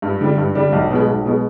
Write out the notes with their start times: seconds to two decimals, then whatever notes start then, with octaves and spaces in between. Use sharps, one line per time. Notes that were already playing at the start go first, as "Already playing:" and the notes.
0.02 G2
0.21 D3 G3 D4
0.38 G2
0.55 D3 G3 D4
0.72 B1
0.90 B2 G#3
1.08 B1
1.25 B2 G#3